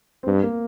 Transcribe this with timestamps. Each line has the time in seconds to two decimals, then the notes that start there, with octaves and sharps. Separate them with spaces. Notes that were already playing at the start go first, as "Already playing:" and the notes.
0.23 C4
0.27 G2 B3
0.43 A#3